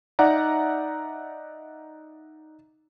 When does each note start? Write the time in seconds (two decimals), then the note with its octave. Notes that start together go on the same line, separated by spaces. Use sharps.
0.19 D#4 D5 E5 F#5 A#5